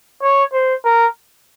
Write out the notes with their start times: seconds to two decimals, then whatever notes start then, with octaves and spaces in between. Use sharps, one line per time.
0.22 C#5
0.53 C5
0.84 A#4